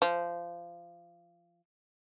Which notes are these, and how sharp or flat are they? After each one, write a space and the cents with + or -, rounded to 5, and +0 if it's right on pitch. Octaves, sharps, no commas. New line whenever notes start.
F3 -20